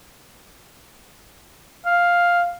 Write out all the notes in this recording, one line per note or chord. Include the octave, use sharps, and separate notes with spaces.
F5